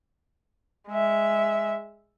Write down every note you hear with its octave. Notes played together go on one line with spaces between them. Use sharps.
G#3 E5